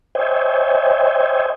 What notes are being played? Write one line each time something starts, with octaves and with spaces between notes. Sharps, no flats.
C5 C#5 D#5 E5 G5 G#5